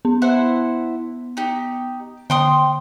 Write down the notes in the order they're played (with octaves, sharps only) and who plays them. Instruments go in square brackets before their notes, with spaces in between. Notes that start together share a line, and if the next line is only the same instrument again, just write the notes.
[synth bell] B3
[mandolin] E4 C5 F#5
D#4 G4
[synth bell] D3 [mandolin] G5 C6 D#6